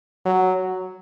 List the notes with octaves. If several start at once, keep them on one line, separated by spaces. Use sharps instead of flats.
F#3